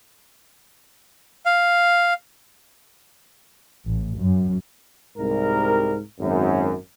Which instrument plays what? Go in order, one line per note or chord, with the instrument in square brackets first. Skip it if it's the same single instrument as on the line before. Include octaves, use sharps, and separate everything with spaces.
[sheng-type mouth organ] F5
[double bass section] A1
F#2
[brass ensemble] C2 A#4 [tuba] G#2
[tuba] G#1 [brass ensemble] F#2